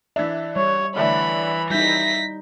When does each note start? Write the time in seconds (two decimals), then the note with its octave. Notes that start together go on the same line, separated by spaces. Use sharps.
0.16 E3 D4 E5
0.56 G3 C#5
0.97 D3 E3 A3 D4 B5
1.70 G3 D#4 E4 G6 A#6 B6